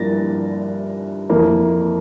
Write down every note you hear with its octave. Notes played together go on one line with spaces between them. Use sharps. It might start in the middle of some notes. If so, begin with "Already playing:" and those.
Already playing: G2 F3 A#3 E4 A6 A#6
F2 E3 A#3 E4